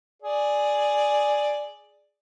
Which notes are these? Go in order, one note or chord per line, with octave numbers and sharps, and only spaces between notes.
G#4 D5